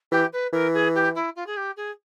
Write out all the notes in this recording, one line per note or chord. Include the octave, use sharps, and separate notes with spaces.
E3 G4
B4
E3 A#4
G#4
G4
E4
F4
G#4
G4
G#4